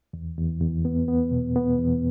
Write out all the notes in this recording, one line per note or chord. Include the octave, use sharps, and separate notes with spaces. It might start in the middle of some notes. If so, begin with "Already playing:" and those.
E2
E2
E2
B3
B3
B2
B3
E2